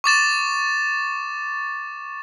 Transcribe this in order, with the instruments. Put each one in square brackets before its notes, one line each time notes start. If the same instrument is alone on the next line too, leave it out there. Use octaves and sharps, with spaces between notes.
[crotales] C#6 D6 A6 E7